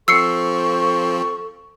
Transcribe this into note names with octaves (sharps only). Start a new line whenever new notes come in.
F3 C4 A4 C#6 E6 C7 C#7